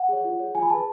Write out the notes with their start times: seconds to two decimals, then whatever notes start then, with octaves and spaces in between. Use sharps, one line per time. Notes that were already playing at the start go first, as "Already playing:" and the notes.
Already playing: F#5
0.09 G#4 C#5
0.25 F4
0.39 G#4 C#5
0.55 F4 G#5
0.62 B5
0.70 G#4 B4 A5